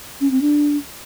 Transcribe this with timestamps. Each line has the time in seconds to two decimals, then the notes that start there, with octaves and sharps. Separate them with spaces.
0.21 C#4
0.31 C4
0.41 D4